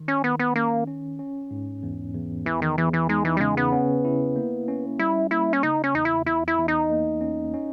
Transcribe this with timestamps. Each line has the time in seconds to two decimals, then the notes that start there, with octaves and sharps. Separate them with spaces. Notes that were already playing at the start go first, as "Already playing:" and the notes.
Already playing: D#3
0.08 C#4
0.24 D#3 B3
0.39 B3
0.56 A#3 C#4
0.87 C#4
1.19 C#4
1.51 G#2
1.83 E2
2.15 E2
2.45 E2 E3
2.62 D#3
2.78 E2 E3
2.93 E3
3.09 G#3 D#4
3.25 E3
3.37 G3
3.40 C#3 G#3
3.57 B3
3.72 C#4
4.05 E4
4.36 A#3
4.68 C#4
4.99 G3 E4
5.31 A#3 E4
5.53 C#4
5.63 C#3 D#4
5.84 C#4
5.94 E2 D#4
6.05 E4
6.26 E2 E4
6.48 E4
6.58 E2
6.68 D#4
6.90 A#3
7.21 C#4
7.54 C#4